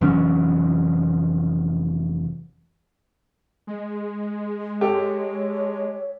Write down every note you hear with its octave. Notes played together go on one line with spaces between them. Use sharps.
F1 E3 F#3 C#4
G#3
G4 A4 C#5